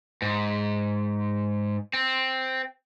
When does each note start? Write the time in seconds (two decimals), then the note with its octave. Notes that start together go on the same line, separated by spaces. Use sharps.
0.22 G#2
1.93 C4